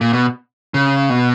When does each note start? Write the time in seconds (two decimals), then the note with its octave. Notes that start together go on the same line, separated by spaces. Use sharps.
0.01 A#2
0.13 B2
0.74 C#3
1.10 B2